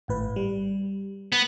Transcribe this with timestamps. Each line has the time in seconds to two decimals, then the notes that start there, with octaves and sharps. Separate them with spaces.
0.08 G#1 A2 B4
0.36 G3
1.32 B3